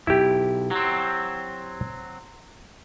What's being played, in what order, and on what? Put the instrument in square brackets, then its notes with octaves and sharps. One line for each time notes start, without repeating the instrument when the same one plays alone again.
[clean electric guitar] B1 [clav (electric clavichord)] E4 G4
[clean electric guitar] F#3 C4